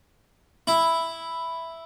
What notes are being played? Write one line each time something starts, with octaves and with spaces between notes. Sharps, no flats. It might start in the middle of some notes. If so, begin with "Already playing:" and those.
E4